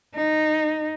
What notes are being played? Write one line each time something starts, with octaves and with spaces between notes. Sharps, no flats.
D#4